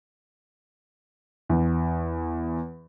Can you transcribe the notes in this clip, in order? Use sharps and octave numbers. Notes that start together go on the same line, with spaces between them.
E2